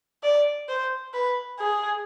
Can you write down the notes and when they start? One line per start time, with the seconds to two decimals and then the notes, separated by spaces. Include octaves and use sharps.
0.23 D5
0.69 C5
1.14 B4
1.60 G#4